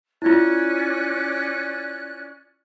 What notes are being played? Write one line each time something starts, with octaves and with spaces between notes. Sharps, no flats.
C#4 E4 F4 D5 F#6